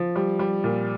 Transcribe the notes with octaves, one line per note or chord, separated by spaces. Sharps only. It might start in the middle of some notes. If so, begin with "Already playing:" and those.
Already playing: F3
G3
G3
A#2